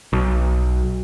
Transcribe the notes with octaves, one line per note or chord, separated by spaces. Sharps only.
B1